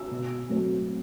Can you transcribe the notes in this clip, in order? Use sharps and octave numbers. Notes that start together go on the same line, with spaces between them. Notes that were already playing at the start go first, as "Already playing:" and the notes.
Already playing: E6
B2
F#3 A3 C4